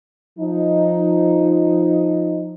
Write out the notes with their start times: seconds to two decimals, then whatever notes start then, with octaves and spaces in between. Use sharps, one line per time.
0.39 F3 D#4